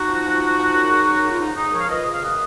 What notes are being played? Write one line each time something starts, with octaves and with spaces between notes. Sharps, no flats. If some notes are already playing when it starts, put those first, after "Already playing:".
Already playing: D#4 F#4
F3
F3
F3
F3
F#2
C#3
F#2
C#3
F4
G#2 D#4
G#2 D#4
F3 A#4 C#5
F5
F3 B4 D#5
C#3 D#5
F5
F#2 B4 D#5